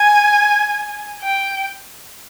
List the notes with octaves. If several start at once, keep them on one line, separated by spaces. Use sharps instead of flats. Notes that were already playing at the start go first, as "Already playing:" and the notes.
Already playing: G#5
G5